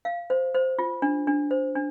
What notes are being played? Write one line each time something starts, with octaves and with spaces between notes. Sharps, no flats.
F5
C5
C5
F4
D4
D4
C5
D4